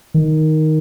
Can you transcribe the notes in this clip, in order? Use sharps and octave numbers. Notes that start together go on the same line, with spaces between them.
D#3